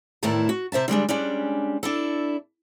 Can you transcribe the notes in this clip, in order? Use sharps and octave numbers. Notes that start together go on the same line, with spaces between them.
E2 A2 D#3 A3 E4 A5
F#4
C3 C5 E5 A5
D3 G3 G#3 D4
G3 G#3 C#4 D4
D4 E4 A4